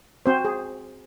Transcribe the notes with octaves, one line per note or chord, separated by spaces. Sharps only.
C4 F#4 C5
G#4